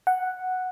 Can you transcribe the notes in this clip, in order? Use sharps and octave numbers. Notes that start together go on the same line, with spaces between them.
F#5